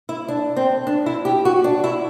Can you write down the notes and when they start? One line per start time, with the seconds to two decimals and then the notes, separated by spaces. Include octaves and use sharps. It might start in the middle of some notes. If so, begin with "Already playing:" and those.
0.09 E4
0.28 D4
0.56 C4
0.87 D4
1.06 E4
1.25 G4
1.45 F#4
1.64 D4
1.84 E4